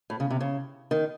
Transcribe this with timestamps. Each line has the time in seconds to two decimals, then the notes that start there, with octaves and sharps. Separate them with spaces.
0.10 A2
0.20 C#3
0.30 C3
0.40 C#3
0.91 D#3